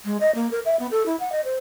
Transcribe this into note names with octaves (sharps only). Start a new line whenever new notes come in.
G#3
D#5
A#3
A#4
E5
B3
A4
E4
F#5
D#5
C5